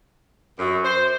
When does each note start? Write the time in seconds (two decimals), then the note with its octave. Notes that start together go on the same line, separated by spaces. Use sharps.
0.59 F#2
0.85 C5